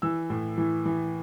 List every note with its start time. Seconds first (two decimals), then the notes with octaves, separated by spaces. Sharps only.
0.02 E3 E6
0.30 A2
0.58 E3
0.86 E3